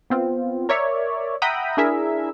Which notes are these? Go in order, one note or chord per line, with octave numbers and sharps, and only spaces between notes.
B3 C4 F4
A#4 C#5 D5 E5
E5 F#5 G5 A#5 B5 D#6
D4 E4 G#4 A#4 E5